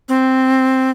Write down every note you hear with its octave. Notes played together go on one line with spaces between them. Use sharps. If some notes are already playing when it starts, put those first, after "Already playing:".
C4